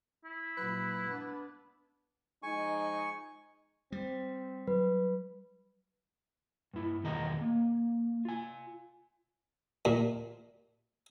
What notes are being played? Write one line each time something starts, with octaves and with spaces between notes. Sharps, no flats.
E4
A#2 F#3 B4
B3 D4
F3 G#3 D#4 G#5 C#6
G3 C4
F#3 B4
G2 E4
E2 B2 D#3 G#4 D#5 A#5
A#3
F4 G#5
A#2